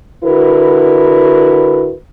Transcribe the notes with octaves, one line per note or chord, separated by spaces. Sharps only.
D3 E4 F#4 A#4 B4